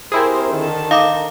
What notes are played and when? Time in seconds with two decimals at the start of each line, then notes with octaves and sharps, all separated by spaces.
0.12 C4 E4 G4 G#4 A#4 C5
0.50 D3 D#3 A5
0.91 D#4 F5 D6